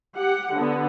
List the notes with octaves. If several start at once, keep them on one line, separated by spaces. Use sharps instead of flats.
G4 F#5
D3 B3